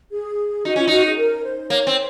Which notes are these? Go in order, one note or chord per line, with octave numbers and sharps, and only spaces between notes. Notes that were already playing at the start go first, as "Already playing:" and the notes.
G#4
D#4 F#4
C#4 F4
D#4 F#4
G#4
A#4
C5
A#3 C#5
C4